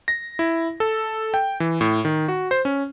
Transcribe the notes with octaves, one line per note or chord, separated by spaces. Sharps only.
A#6
E4
A4
G5
E3
A2
D#3
F#4
C5
C#4